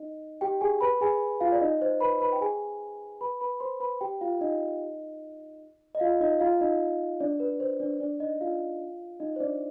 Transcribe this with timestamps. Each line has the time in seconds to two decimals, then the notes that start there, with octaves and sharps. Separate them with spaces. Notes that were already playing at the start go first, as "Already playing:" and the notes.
Already playing: D#4 D#5
0.41 G4 G5
0.61 G#4 G#5
0.81 B4 B5
1.01 G#4 G#5
1.40 F4 F5
1.52 D5
1.60 D#4 D#5
1.82 C5
2.01 B4 B5
2.21 B4 B5
2.32 G5
2.41 G#4 G#5
3.21 B4 B5
3.41 B4 B5
3.60 C5 C6
3.80 B4 B5
4.01 G4 G5
4.21 F4 F5
4.41 D#4 D#5
5.95 D#5
6.00 F4 F5
6.20 D#4 D#5
6.40 F4 F5
6.61 D#4 D#5
7.20 D4 D5
7.40 B4
7.60 C5
7.80 D4 D5
8.00 D4 D5
8.20 D#4 D#5
8.41 F4 F5
9.20 D#4 D#5
9.36 C5
9.40 D4 D5